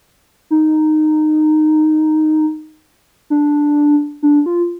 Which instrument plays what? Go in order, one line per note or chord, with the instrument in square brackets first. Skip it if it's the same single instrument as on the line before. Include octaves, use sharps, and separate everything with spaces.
[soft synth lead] D#4
D4
D4
F4